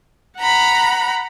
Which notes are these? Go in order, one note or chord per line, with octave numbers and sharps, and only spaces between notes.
F#5 A#5 B5